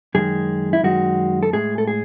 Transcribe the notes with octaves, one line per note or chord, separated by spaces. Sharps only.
F#2 D#3 G#3 G#4
E4
F#2 D#3 G#3 F#4
A4
A2 G#3 G#4
A4
G#4